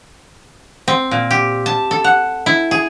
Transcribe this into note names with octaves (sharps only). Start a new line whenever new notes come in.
C4
A#2
G4
A5
A4
F#5
E4
G#4